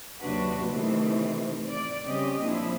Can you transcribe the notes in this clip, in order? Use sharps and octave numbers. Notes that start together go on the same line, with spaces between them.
D#2 C3 F#3 D4 F#4 B4
C3 D#3 E3 A3 C4
D5
C#3 G3 C4 C#4 G4 D#5
A#2 F3 D4 E4